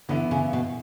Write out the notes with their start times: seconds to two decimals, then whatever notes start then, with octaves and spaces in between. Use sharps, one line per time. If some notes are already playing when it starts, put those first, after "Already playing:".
0.09 D3 E3 B3 E4
0.31 C#3
0.53 B2